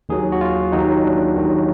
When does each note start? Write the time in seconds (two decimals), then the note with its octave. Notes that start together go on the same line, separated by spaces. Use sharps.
0.09 D#2 D#3 F#3 G#4
0.32 F#4
0.41 F4
0.72 D#2 D#3 F#3 D#4
1.04 D4
1.35 D#2 D#3 F#3